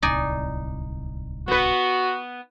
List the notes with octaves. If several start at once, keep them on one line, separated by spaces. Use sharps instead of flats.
D1 C2 D#4 D5 G#5
B3 F#4 B4